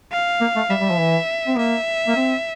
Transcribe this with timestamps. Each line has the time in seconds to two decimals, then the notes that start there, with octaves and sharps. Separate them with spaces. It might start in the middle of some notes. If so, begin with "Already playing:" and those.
0.12 F5
0.41 A#3
0.56 A3
0.70 G3 E5
0.80 G3
0.90 F3
0.99 E3
1.47 C4
1.57 A#3 E5
2.07 A#3
2.16 C4